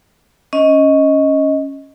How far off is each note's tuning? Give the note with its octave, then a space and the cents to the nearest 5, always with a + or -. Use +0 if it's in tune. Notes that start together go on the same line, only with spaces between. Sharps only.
C#4 +0 D#5 +10